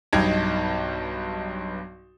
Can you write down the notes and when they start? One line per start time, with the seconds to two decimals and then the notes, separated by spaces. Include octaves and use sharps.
0.13 B1 G2 D#4 G5 G#6